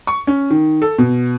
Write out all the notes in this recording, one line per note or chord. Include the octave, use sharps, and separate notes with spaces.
C#6
C#4
D#3
A4
B2